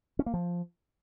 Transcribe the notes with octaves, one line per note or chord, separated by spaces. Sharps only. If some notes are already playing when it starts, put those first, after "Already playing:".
C#4
A#3
F3